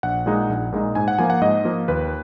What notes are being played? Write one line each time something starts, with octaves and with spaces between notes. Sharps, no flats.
A#1 F#5
A#2 G#3 D#4
A#1
A#2 G#3 D#4
G#2 G#5
F#5
F3 A#3 G#5
F#5
G#2 D#5
F3 A#3
D#2 B4